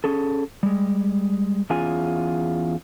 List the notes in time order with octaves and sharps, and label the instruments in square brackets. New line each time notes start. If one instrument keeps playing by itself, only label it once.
[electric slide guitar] C#4 G#4 A4
G3 G#3
E2 C#4 F4 G#4 G#5